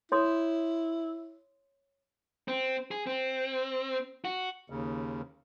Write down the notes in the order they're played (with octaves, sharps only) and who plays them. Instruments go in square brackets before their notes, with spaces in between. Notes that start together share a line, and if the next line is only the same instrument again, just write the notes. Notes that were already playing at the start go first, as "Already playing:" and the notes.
[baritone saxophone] E4 [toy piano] C#5 C6 D#6
[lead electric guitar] C4
G#4
C4
F#4
[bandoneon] D#2 C#3